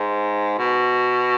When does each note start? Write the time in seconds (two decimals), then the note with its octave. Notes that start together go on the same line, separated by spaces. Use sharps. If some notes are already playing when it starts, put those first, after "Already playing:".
Already playing: G#2
0.58 B2